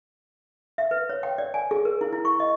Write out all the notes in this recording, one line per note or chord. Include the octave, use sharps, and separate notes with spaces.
E5
B4
C#5
G5
D5
G#5
G#4
A#4
E4
E4
C#6
D#5